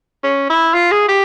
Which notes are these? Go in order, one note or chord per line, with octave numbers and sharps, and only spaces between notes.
C#4
E4
F4
G#4
G4